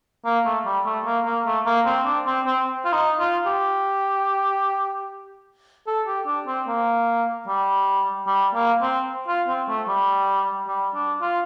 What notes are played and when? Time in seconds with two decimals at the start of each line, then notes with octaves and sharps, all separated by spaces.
0.25 A#3
0.45 A3
0.66 G3
0.86 A3
1.05 A#3
1.25 A#3
1.46 A3
1.66 A#3
1.85 C4
2.06 D4
2.26 C4
2.46 C4
2.85 F4
2.93 D#4
3.20 F4
3.46 G4
5.87 A4
6.07 G4
6.27 D4
6.47 C4
6.67 A#3
7.47 G3
8.27 G3
8.55 A#3
8.81 C4
9.28 F4
9.48 C4
9.68 A3
9.88 G3
10.68 G3
10.94 D4
11.21 F4